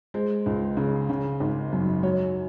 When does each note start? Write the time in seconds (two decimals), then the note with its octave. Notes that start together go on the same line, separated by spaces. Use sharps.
0.14 G#3 C5
0.46 C#2
0.77 C#3
1.10 C#3
1.40 G#1
1.72 F#2
2.03 F#3 C#5